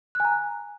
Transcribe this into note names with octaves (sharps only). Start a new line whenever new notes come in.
G#5 A#5 F#6